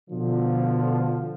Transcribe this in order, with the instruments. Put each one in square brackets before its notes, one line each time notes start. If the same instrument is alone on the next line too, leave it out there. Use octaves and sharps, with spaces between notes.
[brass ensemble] B2 D3 F3